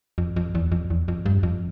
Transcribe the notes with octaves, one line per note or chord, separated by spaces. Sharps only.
F2
F2
E2
F2
E2
F2
G2
F2